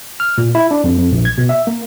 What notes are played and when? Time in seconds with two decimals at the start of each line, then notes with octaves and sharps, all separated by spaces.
0.20 F6
0.38 A#2
0.55 E4
0.71 D4
0.84 F2
0.98 F2
1.12 A#1
1.25 G#6
1.38 B2
1.49 E5
1.67 A#3